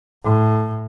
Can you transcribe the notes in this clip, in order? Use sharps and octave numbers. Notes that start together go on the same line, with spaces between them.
A2